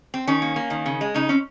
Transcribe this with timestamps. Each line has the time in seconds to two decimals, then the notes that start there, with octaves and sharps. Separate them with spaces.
0.14 C4
0.27 D#3 C#4
0.42 A#3
0.56 A#3
0.70 D#3
0.86 C#3
1.01 G#3
1.14 C#3 D#4
1.29 C4 C#4